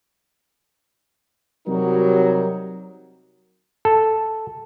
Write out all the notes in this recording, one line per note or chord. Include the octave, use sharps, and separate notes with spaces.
C3 F#3 G3 D#4 F#4 A#4
A4